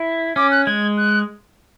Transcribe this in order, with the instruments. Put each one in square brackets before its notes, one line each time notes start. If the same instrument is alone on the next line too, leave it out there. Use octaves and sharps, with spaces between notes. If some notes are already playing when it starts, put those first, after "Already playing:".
Already playing: [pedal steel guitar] E4
[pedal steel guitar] C#4 [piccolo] D6
[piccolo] F#6
[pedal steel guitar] G#3 [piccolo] G#6
[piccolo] F#6